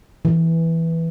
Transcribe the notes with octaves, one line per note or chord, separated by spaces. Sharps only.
E3